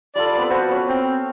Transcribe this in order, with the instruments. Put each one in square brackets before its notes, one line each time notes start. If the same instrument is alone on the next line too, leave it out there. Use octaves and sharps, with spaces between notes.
[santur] G3 F4 A4 [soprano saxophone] D5
[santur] B3 C4 B4
[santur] F3 B4 C5 [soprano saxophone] F#4
[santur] B3 C#4 C#5
[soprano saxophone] C4